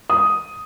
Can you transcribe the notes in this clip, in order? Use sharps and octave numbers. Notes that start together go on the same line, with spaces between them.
D#6